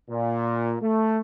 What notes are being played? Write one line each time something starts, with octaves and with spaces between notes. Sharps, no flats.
A#2
A3